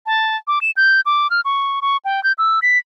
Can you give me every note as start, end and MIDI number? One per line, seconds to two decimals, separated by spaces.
0.06 0.36 81
0.48 0.59 86
0.61 0.71 100
0.77 1.01 91
1.06 1.30 86
1.30 1.41 89
1.45 1.80 85
1.82 1.97 85
2.05 2.23 79
2.24 2.32 91
2.38 2.60 88
2.62 2.78 95